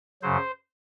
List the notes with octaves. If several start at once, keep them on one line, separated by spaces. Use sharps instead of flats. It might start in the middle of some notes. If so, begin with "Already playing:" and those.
F#2 C#3 F#3 C5